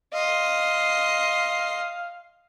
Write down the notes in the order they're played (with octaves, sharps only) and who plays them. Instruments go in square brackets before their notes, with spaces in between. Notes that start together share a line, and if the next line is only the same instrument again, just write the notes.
[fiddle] D#5 C6 [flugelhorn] F5